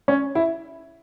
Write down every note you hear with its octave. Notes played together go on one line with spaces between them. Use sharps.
C#4
E4